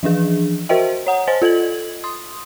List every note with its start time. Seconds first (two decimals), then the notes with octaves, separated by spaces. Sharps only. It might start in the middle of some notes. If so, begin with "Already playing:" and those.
0.03 E3 F3 D4 G#4
0.69 F#4 A#4 C5 D#5 E5 G5
1.07 C#5 F#5 A#5
1.27 C5 D#5 G#5 A6
1.42 F4 A4 D#5 G#6 F#7
2.04 C6 D#6